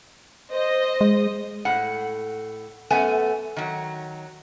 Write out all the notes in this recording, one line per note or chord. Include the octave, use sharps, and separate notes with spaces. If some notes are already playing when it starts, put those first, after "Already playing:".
C5 D#5
G#3
A2 F#5
F#2 A3 B3 G#5
D#3 F#3